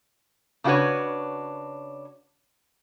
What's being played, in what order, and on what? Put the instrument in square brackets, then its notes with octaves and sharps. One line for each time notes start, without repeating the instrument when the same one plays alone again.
[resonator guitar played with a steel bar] C#3 D4 E4 F#4 B4 C#5